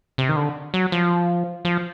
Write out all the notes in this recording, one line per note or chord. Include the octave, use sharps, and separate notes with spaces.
C3
D#3
D3
F#3
F3
F3